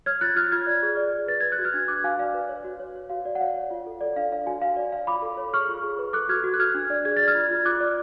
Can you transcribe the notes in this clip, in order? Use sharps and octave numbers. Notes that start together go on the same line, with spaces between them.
C#5 F6 G#6
F4 F#6 A6
F4 F6 G#6
F4 F6 G#6
D5
G#4
D5
G#4
B4 A6
B4 G#6
F#6
F#4
F6 G#6
D4
F#4 D6 F#6
F#4 F5 G#5
D5 F5
B4
C#5
F#4
C#5
C#5
F#4 F5
F#4 D5
F#5
C#5 F5
C#5
F4
A4
A4 D5
D4 F5
C#5 F5
F#4 F5 G#5
F#4 F5
C#5 D5
C#5 F5
F4 B5 D6
A4
C#5
G#4 C#6 F6
F4
G#4
B4
A4 D6 F#6
F#4 F6 G#6
F#4
F#6
F#4 F6 G#6
D4
D5
G#4 G#6
D5 A6
F6 G#6
F4
F4
F4 D6 F#6
D5